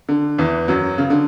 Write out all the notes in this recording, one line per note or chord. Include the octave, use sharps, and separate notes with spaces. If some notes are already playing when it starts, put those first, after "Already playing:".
D3
E2 E3
F#2 F#3
C#3
D3